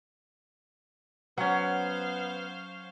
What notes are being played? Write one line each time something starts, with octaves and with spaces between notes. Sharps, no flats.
F#3 B3 C#4 C5 F5 F#5